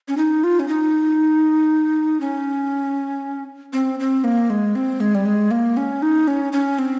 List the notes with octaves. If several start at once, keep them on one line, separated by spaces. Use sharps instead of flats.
C#4
D#4
F4
C#4
D#4
C#4
C4
C4
A#3
G#3
C4
G#3
G3
G#3
A#3
C#4
D#4
C#4
C#4
C4